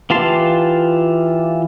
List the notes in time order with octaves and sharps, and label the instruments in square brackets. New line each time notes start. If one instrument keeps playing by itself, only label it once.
[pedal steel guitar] E3 F4 G4 A5 C6